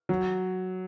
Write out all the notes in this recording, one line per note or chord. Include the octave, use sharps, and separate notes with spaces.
F#3